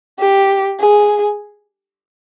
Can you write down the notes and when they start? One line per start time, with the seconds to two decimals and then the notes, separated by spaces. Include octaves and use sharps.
0.19 G4
0.80 G#4